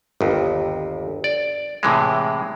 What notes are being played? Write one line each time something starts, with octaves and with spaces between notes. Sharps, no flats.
G1 D#2
D5
A2 C3 E3 G#3